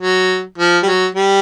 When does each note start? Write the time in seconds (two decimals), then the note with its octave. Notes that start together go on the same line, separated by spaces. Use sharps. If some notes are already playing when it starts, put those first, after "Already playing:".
0.01 F#3
0.59 F3
0.83 G3
0.86 F#3
1.15 G3